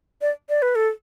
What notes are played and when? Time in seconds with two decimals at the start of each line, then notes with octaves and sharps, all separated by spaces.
0.21 D5
0.49 D5
0.62 B4
0.75 A4